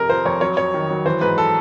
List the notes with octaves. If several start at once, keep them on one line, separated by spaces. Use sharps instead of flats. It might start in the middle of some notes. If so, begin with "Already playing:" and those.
Already playing: F2 C3 A#4
F3 C5
F2 C#5
F#3 C#5
F#3 C#5
D#3
F#3
E3 C5
G#2 B4
A4